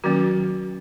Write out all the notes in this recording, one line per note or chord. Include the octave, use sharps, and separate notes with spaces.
D#3 F#3 A#3 C#4 F#4